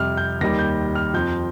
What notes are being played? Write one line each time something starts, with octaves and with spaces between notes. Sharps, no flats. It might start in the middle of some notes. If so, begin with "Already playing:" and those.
Already playing: F2 C3 G3 F6
G6
D#2 D#3 G3 A#6
G6
F6
F2 F3 G6